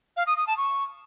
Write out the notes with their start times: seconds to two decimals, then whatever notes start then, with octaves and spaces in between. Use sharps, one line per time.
0.17 F5
0.27 D#6
0.37 D#6
0.47 A5
0.57 C#6